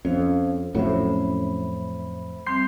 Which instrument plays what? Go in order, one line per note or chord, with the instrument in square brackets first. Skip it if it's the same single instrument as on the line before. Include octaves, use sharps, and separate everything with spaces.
[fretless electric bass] F2 [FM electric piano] C#4 [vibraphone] C5 F5
[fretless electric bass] F2 A2 F#3 [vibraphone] C5 E5 B5
[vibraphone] G3 C4 [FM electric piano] C6 G6 C7